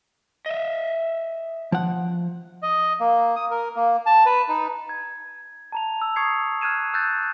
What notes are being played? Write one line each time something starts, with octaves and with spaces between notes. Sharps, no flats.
D#5 E5
F3 F#5
D#5
A#3
D#6
A#4
A#3
A5
B4
D#4
G#6
A5 A#5 F7
E6
C#6 D#6 G#6 C7 C#7
F6 F#6 G#6 D#7 E7
E6 F#6 G6 A6